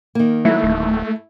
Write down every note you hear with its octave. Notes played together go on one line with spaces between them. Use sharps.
D#3 A#3
F#3 A3 E4
D1